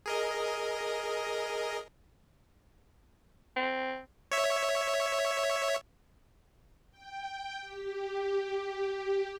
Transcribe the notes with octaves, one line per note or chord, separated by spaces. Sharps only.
G#4 A#4 D#5
C4
C#5 E5
G5
G4